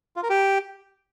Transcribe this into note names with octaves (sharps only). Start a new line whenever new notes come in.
F4
A#4
G4